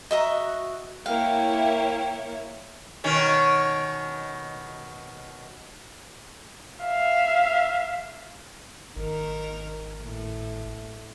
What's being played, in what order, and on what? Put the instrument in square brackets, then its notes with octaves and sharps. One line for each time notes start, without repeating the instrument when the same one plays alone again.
[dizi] F#4 [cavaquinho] D#5 E5 A#5
[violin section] A#3 E4 C#5 [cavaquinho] F5 [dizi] G5
[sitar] B2 D#3 C#4
[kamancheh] E5 F5
[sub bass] G#1 [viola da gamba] D#3 A#4
[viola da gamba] A2